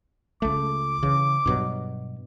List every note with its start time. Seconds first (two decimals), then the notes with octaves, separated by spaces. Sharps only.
0.42 C#2 A3 D6
1.03 C#3 E3
1.46 G2 B2 F#3